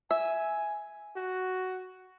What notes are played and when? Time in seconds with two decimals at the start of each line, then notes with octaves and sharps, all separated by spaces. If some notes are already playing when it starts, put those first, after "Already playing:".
0.11 E5 G#5
1.16 F#4